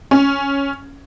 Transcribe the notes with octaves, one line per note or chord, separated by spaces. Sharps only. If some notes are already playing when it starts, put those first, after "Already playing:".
C#4